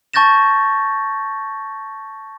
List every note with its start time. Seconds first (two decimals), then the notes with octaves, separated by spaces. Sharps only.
0.14 A5 C#6 G6 A6 A#6 E7